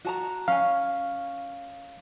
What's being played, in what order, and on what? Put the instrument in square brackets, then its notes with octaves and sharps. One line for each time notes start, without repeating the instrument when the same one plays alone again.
[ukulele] F#4 A5 A#5
[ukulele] C#4 G#5 [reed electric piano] F5